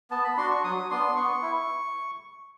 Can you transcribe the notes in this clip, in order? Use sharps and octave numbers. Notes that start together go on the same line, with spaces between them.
B3 A5
B5
D4 F#4 C6
C#6
F#3 D#6
B3 D4 C6
B3 C#6
E4